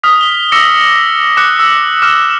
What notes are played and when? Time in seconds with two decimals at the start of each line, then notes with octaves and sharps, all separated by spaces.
0.03 D#6 F6 B6
0.21 G7
0.52 D6 E6 A#6 C#7
1.37 D6 F#6 C#7
1.59 E6
2.02 D6 F6 E7